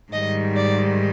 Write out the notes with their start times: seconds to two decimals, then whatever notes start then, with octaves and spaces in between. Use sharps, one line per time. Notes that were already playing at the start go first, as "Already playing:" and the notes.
0.12 G#2 D#3 G3 D#5
0.56 D5